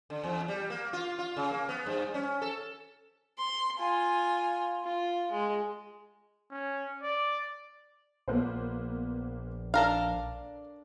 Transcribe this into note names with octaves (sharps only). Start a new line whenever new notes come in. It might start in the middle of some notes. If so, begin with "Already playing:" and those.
D3
E2
G3
A#3
F4
F4
C#3
A#3
B3
G2
C#4
A4
C6
F4 G#5
F4
G#3
C#4
D5
A#1 A#3 B3 C5
D4 A4 A#4 F5